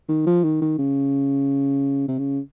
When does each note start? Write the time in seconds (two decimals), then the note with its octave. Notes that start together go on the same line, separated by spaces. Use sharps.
0.09 D#3
0.27 F3
0.44 D#3
0.62 D#3
0.79 C#3
2.08 C3
2.19 C#3